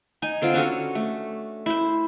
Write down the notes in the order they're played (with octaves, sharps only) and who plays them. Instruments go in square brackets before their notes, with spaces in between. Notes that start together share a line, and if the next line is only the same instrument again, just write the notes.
[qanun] D#4 G#5
D3 C4 F4
C#4 D4 F#4 A4
A3
E4 C5